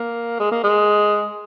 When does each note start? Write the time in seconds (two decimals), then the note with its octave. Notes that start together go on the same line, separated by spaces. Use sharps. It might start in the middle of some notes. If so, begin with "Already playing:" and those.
Already playing: A#3
0.40 G#3
0.51 A#3
0.63 G#3